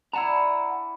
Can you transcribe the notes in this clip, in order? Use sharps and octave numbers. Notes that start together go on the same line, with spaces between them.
D4 E4 F#5 A5 A#5